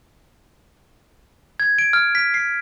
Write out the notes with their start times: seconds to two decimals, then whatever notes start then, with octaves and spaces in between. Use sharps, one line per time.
1.60 G#6
1.79 D7
1.93 F6
2.15 B6
2.34 C7